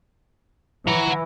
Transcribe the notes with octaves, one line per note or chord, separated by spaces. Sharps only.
E3 F#5 A#5